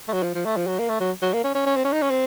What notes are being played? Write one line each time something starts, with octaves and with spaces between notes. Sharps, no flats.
A3
F#3
F3
F3
A3
F3
F#3
A#3
A3
F#3
F#3
A#3
C#4
C#4
C#4
C4
C#4
D#4
C#4
C4